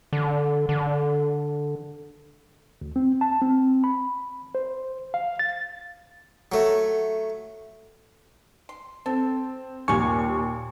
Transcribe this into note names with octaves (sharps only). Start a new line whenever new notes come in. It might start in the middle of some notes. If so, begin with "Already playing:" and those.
D3
D3
D2
C4
A5
C4
B5
C5
F5
A6
F#3 A3
C6
C4 A4
D#2 A#2 G3 F5 G#5 C#6